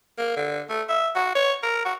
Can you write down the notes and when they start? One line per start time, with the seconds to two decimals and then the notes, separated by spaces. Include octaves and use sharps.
0.18 A#3
0.36 D3
0.69 A3
0.89 E5
1.15 F#4
1.35 C#5
1.62 A#4
1.85 F#4